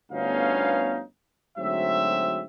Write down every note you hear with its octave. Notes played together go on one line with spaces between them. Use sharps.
G1 D2 B3 C#4 D#4 F5
D2 G#2 F#3 C4 E5